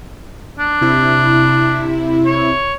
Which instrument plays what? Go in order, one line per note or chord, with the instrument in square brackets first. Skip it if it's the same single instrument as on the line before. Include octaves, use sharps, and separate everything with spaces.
[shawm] D4
[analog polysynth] C3 E4
[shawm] C#5